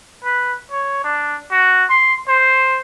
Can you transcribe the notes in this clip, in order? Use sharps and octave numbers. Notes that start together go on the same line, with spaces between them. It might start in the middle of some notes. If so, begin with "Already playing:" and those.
B4
C#5
D4
F#4
C6
C5